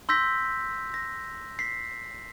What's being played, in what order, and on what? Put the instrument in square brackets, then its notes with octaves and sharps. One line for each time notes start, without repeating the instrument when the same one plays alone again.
[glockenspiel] C6 E6 G6 A#6 B6
A#6
B6 C7